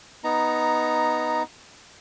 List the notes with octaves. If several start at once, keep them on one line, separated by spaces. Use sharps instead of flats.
B3 D#4 A#5